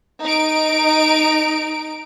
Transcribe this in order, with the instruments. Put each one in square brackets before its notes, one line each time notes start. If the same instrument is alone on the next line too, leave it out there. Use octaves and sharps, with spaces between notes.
[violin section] D#4 D7